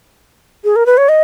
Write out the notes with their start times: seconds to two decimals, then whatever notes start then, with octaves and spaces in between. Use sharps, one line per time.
0.64 G#4
0.76 A#4
0.86 B4
0.98 C#5
1.09 D#5